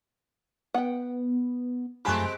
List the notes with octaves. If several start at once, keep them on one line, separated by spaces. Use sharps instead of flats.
B3 F#5 G5
F#2 F3 G#3 A3 C4 G4 G#5 B5